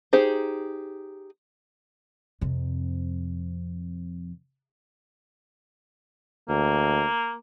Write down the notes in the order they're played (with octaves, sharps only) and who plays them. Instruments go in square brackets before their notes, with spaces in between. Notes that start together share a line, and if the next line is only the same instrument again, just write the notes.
[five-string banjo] D#4 G4 G#4 C5
[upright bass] F2 C3
[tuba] D2 [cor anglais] A#3